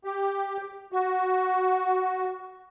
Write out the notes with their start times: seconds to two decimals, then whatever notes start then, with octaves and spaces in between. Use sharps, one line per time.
0.04 G4
0.92 F#4